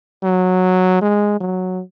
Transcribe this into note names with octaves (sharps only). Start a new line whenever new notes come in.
F#3
G#3
F#3